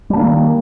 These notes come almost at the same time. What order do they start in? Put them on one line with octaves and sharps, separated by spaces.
G3 D4 A#3 D#3